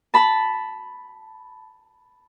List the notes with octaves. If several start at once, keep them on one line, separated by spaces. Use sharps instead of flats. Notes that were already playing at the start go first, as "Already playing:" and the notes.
A5 B5